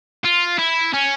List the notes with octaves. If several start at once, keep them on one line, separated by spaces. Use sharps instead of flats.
F4
E4
C#4